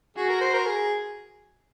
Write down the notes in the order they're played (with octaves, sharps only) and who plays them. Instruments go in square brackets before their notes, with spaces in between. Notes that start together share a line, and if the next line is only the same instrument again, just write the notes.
[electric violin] F#4 [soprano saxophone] G#4
[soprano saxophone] A#4
C5
A#4
G#4